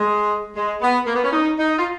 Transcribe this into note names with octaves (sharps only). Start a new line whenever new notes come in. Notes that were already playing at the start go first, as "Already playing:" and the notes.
Already playing: G#3
G#3
B3
A#3
B3
C#4
D#4
D#4
F4